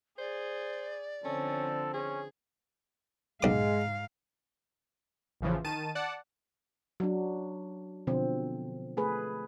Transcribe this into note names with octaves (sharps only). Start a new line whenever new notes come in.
G#4 C5 D5
D3 F3 C4 C#4 A4
C#4 G#4
B1 G#2 G#3 F5 D6
A1 E2 C#3 E3 F3
D#3 A5 D#7
D5 F#5 A5
F#3 D4
B2 D3 F3 C4
A3 G#4 B4